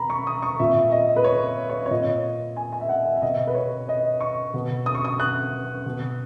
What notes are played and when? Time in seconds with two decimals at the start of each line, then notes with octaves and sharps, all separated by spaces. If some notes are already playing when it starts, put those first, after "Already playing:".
Already playing: B2 A#5 B5
0.10 C#6
0.27 D#6
0.42 C#6
0.59 A#2 E5
0.91 D#5
1.16 B4
1.24 C#5
1.69 C#5
1.86 C#5
1.91 A#2 D#5
2.56 G#5
2.72 G#5
2.81 E5
2.89 F#5
3.05 E5
3.16 E5
3.22 B2 D#5
3.47 B4
3.55 C#5
3.89 D#5
4.20 C#6
4.54 B2
4.86 D#6
4.95 C#6
5.05 D#6
5.20 F#6
5.86 B2